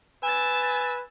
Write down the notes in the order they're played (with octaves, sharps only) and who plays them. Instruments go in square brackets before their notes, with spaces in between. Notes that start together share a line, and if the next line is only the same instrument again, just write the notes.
[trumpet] B4 [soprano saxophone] G#5 [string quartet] E6 A6